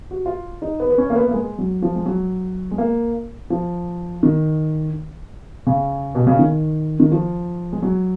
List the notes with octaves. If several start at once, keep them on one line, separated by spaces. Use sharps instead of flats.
F#4
F4
D#4
B3
B3
C#4
A#3
B3
A#3
G#3
F#3
F3
G#3
F#3
G#3
A#3
F3
D#3
C#3
B2
C#3
D#3
D#3
F3
G#3
F#3